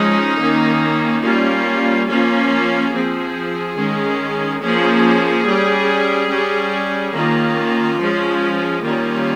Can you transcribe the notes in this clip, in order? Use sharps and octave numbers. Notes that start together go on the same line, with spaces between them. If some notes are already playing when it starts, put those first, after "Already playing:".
Already playing: F3 G#3 C#4 D#4
D#3 A#3 C#4
G3 A#3 C#4 F4
F3 A#3 C#4 F4
F3 C4 G#4
D#3 G#3 C#4
F3 A#3 C#4 G#4
G3 C#4
G3 C#4
D#3 A#3 C#4 F4
F3 G#3 C#4
D#3 G3 A#3 C#4 F4